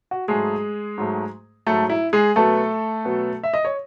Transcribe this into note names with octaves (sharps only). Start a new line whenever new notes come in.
F#4
G#2 F#3 G#3 A3 G#4
G#2 F#3 A3
G#2 F#3 A3 A4
E4
G#3 G#4
B2 F#3 A3 B3 A4
B2 F#3 B3
E5
D#5
C#5